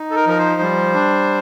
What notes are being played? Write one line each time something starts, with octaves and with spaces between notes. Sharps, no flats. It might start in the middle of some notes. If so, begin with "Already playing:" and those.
Already playing: D#4
A4
A#4
F3 A#4
C5
G3
D4